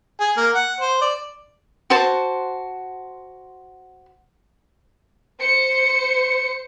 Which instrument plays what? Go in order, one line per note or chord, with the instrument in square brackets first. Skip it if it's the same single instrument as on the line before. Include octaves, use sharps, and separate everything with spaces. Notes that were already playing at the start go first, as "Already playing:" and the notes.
[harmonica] G#4
A#3
F#5
C5
D5
[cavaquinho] F#4 C5 A5
[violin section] C5 C#7